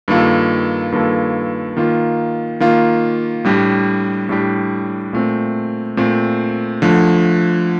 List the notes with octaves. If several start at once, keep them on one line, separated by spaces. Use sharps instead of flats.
G2 D#3 A#3 F4 A4
G2 D#3 A#3 F4 A4
D#3 A#3 F4
D#3 A#3 F4
A2 G3 D4 G4
A2 G3 D4 G4
A#2 A3 C4
A#2 A3 C4
D3 F3 A3